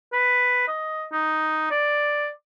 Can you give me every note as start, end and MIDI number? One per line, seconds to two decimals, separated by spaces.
0.13 0.64 71
0.68 1.06 75
1.12 1.67 63
1.71 2.30 74